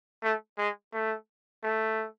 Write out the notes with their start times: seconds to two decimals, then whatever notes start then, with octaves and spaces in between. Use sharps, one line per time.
0.23 A3
0.58 G#3
0.93 A3
1.63 A3